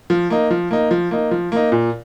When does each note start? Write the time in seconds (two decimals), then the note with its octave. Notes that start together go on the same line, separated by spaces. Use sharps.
0.10 F3
0.30 A#3 D#4
0.51 F3
0.71 A#3 D#4
0.91 F3
1.11 A#3 D#4
1.31 F3
1.52 A#3 D#4
1.72 A#2